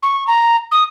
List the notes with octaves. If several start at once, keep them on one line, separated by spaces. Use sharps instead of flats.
C#6
A#5
D#6